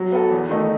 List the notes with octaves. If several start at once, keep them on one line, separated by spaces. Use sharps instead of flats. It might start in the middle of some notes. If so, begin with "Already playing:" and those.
Already playing: F#3
B3 F#4 A4
E2
D#3 A3 D#4